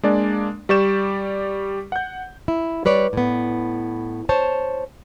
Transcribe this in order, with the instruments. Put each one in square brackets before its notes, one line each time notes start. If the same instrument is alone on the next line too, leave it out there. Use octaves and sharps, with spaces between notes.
[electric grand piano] G#3 A#3 D4 D5
G3 G4 D5 C#6 G6 E7
F#5 G6
[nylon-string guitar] E4
G3 B4 C#5 D5
A2 B3
C5 C#5 A5